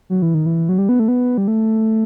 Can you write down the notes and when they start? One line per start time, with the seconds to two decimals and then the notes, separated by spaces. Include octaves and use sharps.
0.10 F#3
0.22 E3
0.34 D#3
0.46 E3
0.69 F#3
0.78 G3
0.89 B3
0.99 A3
1.08 B3
1.38 G3
1.48 A3